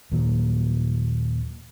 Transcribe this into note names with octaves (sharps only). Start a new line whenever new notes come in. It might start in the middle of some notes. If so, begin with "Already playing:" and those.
D#2 A#2 F#3 A#3